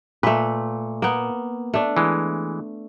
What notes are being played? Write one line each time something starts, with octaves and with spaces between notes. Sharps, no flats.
A#2 A3 B4
A#3 B3
A3 D4
E3 G#3